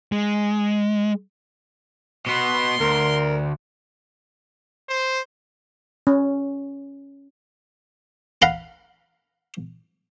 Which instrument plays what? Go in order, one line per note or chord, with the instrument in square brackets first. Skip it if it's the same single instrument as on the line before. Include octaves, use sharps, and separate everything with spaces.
[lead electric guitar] G#3
[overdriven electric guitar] B2 B3 [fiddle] C6
[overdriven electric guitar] D2 [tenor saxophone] A#4
[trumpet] C5
[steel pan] C#4
[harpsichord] F5 F#5 A#5 B5